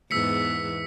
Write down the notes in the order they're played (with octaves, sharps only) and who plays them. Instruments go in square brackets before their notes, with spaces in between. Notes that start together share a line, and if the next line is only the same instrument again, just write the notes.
[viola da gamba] E2 G#2 B3 [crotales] E6 B6 C#7